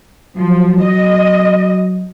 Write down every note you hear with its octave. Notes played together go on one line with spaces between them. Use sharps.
F3 F#3
D#5